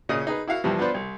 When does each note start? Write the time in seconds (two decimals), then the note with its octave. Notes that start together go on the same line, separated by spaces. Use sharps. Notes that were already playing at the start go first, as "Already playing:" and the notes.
0.09 A#2 C#3 C#4 D#5 D#6
0.27 D#4 G#4 B4
0.47 E4 F#4 F5 F#5
0.64 G2 C3 E3 F3
0.79 B3 D4 F4 B4 C5 D5
0.94 C2